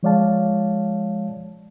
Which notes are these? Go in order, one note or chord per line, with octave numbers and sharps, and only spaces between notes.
F3 G#3 C#5 D5 F5 A5